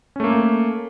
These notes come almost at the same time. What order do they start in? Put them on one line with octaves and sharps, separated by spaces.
C#4 A3 A#3